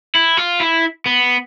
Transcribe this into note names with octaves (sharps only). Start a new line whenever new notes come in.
E4
F4
E4
B3